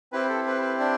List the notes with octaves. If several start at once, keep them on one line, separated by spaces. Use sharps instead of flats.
C4 E4 G4 B4
A4
B4
B4
D4 D5